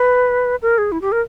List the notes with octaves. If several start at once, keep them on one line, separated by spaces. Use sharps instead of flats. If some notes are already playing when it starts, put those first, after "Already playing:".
Already playing: B4
A#4
G#4
E4
G4
A#4